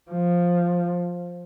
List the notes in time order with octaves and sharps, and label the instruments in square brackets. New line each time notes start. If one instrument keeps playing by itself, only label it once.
[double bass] F3